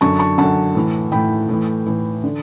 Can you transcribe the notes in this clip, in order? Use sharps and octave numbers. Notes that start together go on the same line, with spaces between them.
F#2 D3 A5 C#6
A5 C#6
F#2 D3 F#5 A5
A2 E3
A2 E3 G5 B5
A2 E3
A2 E3
D3